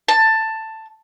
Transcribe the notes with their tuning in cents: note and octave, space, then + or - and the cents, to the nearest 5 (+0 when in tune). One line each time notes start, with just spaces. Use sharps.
A5 +10